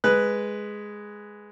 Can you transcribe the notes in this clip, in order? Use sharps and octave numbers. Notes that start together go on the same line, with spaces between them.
G#3 B4 F#6